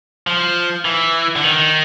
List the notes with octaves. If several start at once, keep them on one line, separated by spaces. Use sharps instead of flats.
F3
E3
D3
D#3